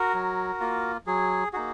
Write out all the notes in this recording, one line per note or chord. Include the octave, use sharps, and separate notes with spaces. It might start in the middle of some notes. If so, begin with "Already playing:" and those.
Already playing: F#4 A#4
F#3
A#3 F4
F#3 G#4
A#3 D#4 F#4 G#4